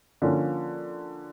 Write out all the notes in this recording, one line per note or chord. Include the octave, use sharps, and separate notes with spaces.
D3 F3 A#3 C#4 F4